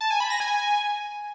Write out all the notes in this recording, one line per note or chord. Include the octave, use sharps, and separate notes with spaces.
A5
G#5
B5
A#6
G#5